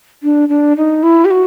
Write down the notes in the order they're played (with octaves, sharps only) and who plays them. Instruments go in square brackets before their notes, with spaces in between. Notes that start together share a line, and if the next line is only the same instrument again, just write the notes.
[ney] D4
D4
D#4
E4
G4
F#4